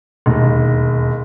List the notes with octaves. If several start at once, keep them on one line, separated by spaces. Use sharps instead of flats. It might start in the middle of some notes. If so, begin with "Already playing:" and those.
E1 D#2